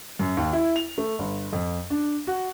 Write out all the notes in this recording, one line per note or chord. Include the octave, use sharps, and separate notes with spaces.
F#2
D#2
E4
F7
A3
G1
F2
D4
F#4